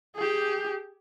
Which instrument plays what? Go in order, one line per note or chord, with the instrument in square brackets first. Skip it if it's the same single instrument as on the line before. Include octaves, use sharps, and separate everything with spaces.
[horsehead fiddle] G4 G#4